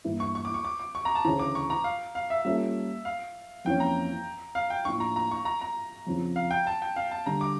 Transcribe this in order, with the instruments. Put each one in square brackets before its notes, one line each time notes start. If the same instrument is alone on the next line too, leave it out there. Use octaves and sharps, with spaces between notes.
[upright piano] G2 E3 A#3 E4
[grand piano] C#6
C#6
D6
C#6
D6
D6
C#6
A#5
A5
[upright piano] D2 C#3 E3 [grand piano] A#5
[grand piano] D6
C#6
A#5
F5
F5
E5
[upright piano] G3 A#3 C#4 F4 A4 [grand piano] E5
[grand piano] F5
[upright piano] F2 E3 A#3 C#4 [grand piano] G5
[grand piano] A#5
F5
G5
[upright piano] A2 F3 A#3 D4 [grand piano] C#6
[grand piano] A#5
A#5
C#6
A#5
A#5
[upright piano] F2 C#3 F3
[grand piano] F5
G5
A5
G5
F5
A5
[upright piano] D3 G3 D4 [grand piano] A#5
[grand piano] D6